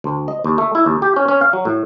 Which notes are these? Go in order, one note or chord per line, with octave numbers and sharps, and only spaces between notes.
D2
D#5
D#2
A3
E4
D#2
G4
C#4
C#4
F5
F#3
A2